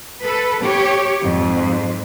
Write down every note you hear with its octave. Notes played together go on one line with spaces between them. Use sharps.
A4 B4
G4 C#5
F2 G#2